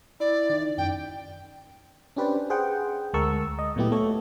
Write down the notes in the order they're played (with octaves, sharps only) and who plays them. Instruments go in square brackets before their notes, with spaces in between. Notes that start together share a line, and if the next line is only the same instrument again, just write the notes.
[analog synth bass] E4 [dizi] D5
[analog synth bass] D#3
[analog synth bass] F#2 [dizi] G5
[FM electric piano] C#4 D4 G4 B4 C5 D5
G#4 C5 F#5 G5
D2 G#3 A#4 A5 C#6 E6
D#5
A#2 F#3 A3 B3 E4 G4
A3 A4 C#5